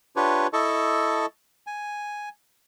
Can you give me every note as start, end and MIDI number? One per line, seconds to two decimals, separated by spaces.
0.16 0.47 62
0.16 0.47 65
0.16 0.47 67
0.16 0.47 71
0.16 0.47 73
0.53 1.26 64
0.53 1.26 69
0.53 1.26 75
0.53 1.26 81
0.53 1.26 85
1.67 2.29 80